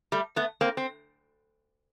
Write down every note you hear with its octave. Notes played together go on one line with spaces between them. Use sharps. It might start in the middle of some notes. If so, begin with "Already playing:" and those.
G3 A3
A3 B3
A#3 C4
C4